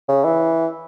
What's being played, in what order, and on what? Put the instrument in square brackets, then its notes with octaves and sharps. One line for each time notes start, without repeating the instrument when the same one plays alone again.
[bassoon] C#3
E3